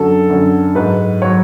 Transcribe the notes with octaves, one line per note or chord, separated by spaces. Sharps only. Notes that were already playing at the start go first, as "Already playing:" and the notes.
Already playing: F#2 D3 F#3 A4
F#2 D3 F#3
G#2 F#3 B4
C#5
F#3